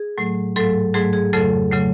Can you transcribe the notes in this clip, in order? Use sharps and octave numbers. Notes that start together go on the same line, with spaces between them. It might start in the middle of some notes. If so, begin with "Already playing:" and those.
Already playing: G#4
A2 F#3 A3
G#2 F#3 A3 A4
G#2 F#3 A3 G#4
G#4
F2 C#3 F#3 A3 A4
C#3 F#3 A3